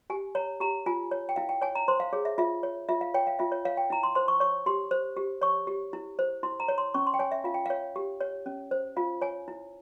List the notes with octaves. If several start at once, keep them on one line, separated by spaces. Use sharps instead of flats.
G4 G#5
C#5 A#5
G4 A#5
F4 G#5
C#5
G5
E4 F5
G5
C#5 G#5
A#5
C5 C6
F5
G#4 C#5
E5
F4 E5
C#5
F4 E5
F5
C#5 G5
F5
F4 E5
C#5
C#5 F5
G5
E4 A#5
C6
C5 C6
C#6
C#5 C#6
G4 C6
C5
G4
C#5 C#6
G4
E4
C5
E4 C6
A#5
C#5
C6
C#4 C#6
C6
G5
C#5 G#5
E5
F4 F5
G5
C#5 F5
G4
C#5
C#4
C5
F4 F5
C#5 G#5
E4